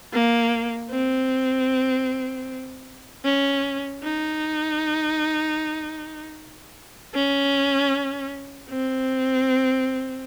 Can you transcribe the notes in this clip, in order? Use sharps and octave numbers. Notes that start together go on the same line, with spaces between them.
A#3
C4
C#4
D#4
C#4
C4